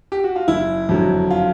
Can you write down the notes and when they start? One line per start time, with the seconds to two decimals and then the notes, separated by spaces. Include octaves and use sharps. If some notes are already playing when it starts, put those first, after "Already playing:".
0.12 G4
0.24 F#4
0.36 F4
0.48 F#1 E4
0.89 F2 D3 F#3
1.31 F4